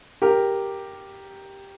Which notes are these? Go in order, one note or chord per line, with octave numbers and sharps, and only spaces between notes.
G4 A#4